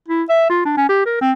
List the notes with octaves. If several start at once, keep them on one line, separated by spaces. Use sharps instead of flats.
E4
E5
F4
D4
C#4
G4
A#4
C4